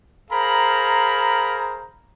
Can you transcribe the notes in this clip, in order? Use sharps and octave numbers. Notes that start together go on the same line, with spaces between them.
G#4 A#4 C5 F5 A#5 B5